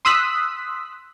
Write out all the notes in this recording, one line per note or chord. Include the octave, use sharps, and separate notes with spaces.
C6 D#6 E6 F#6 B6